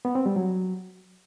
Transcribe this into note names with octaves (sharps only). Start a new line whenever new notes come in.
B3
C4
G3
F#3